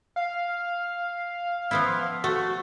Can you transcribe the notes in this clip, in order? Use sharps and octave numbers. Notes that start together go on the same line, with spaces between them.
F5
F3 B3 E4
A3 F#4